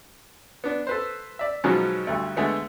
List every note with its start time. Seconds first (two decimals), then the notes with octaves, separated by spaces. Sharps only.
0.64 B3 D4
0.87 A4 B4 C5
1.39 D5 E5
1.64 B2 D#3 F3 F#3 G#3 C#4
2.07 D2 G2 A3
2.37 D3 G#3 A3 B3